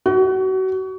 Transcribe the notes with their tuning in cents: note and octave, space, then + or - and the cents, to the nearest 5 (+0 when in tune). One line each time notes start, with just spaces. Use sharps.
F#4 +30